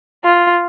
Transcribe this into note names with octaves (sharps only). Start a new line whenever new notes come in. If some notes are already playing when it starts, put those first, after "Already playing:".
F4